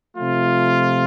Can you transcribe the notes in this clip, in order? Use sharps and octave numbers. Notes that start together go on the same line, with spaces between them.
C3 F3 A3 F4